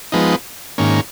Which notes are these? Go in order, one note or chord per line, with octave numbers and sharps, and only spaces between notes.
F3 G#3 B3 D#4
G#2 D#3 A#3 C#4